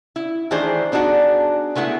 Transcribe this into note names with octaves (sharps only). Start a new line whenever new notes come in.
E4
D#3 E3 A3 D4 G#4 C5
B3 D4 D#4 F#4 G#4
G#3 A3 B3 E4 G#4